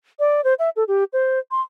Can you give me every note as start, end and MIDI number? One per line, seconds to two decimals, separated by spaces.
0.19 0.41 74
0.44 0.54 72
0.59 0.69 76
0.76 0.84 69
0.88 1.04 67
1.13 1.39 72
1.51 1.61 84